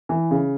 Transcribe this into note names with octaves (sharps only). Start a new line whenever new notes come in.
E3
C#3